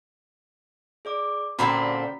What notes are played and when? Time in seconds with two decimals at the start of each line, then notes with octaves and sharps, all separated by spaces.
1.05 G#4 D5 D6
1.59 A#2 D3 C4 C#4 F#4 A#5 B5 B6